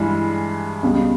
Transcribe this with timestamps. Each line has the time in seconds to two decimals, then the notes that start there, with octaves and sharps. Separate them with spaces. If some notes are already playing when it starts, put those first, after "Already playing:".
Already playing: G2 E3 G3 G#3
0.83 C#2 B2 G3